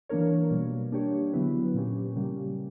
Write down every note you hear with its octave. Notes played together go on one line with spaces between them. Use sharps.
E3 A#3 D4 A#4 C#5
B2 G3 A#3
A#3 D4 G4 C#5
D3 F#3 B3 E4 B4
A#2 A#3 C#4 G4
C#3 G3 A#3 C#4 G4